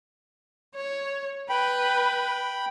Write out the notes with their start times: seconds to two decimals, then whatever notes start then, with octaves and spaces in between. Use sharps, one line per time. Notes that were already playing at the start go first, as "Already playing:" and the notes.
0.76 C#5
1.49 B4 G5 B5